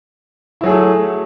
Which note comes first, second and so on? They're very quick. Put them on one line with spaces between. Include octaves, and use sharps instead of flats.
E4 F#3 G#4 A3